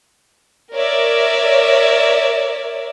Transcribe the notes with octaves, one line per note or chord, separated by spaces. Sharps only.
A#4 C#5 D5 E5